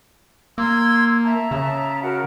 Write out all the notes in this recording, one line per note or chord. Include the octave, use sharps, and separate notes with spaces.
A#3 C6 E6 G#6
E5 A5 A#5
C#3
F#4 A#4 F#5